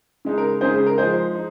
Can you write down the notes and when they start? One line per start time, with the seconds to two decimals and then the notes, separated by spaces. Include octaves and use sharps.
0.25 C#3 G#3 D#4
0.38 A#4
0.61 C#3 G#3 D#4 G#4 C5
0.73 G#4
0.86 A#4
0.98 F3 G#3 D#4 G#4 C5
1.35 D#4